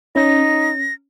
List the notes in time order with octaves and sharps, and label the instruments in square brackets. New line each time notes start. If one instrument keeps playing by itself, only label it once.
[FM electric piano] C#4 [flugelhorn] D#4 [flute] A#6